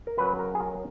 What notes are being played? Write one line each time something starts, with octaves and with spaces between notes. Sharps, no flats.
A#4
F#2 C#3 F#3 C#4 B4
A#4
G#4
A#4